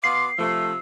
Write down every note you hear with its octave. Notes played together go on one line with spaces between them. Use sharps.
B2 B3 F5 C6 D6 C7
C3 F3 A3 E6